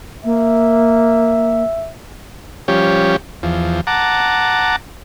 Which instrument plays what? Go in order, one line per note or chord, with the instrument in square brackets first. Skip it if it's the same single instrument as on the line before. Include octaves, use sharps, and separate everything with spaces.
[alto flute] A#3 [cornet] E5
[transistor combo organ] F3 G3 C#4 G4 C#5
E2 F3
F#5 A5 A#5 D6